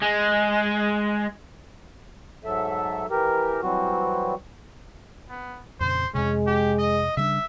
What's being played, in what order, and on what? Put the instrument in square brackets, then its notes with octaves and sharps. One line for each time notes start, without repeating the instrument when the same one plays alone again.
[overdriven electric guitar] G#3
[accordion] G#2 F#3 A4 E5
E3 G4 A#4
E3 F#3 G3 C4 F#4
[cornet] B3
[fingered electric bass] F2 A#2 C#3 [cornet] C5
[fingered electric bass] F2 C3 [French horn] G#3 [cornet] C#4
[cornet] G4
D#5
[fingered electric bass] C#3 G3 D4 [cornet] E5